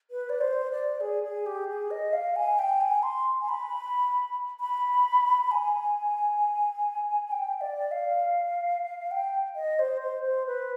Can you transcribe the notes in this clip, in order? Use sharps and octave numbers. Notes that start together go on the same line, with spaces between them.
B4
D5
C5
D5
G#4
G#4
G4
G#4
D#5
F5
G#5
G5
G#5
C6
G#5
B5
B5
G#5
G5
D5
F5
G5
D#5
C5
C5
C5
B4